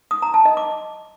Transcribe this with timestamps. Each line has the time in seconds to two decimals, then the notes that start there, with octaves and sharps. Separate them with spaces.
0.11 D#6
0.22 A#5
0.34 A5
0.45 D#5
0.57 D6